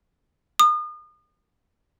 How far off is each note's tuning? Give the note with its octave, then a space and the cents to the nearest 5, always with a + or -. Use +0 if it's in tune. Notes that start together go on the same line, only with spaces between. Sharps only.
D#6 -35